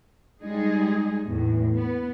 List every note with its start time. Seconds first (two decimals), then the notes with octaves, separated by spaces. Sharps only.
0.42 G3 G#3 D#4 G#4
1.27 E2 A2
1.75 B3